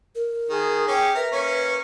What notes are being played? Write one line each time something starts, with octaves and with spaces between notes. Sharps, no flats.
A#4
D#3 G#4
C#4 G4 G5
A#4 B4 E5
A#3 C#4 C#5